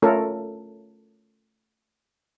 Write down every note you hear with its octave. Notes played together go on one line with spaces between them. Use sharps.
A3 C#4 F4 A4 A#4